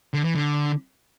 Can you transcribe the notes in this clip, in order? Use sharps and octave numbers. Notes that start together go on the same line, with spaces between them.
D3
E3
D3